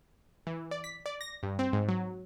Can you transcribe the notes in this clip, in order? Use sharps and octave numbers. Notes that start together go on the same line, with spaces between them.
E3
D5
B6
D5
A#6
G2
C4
G#2
F#3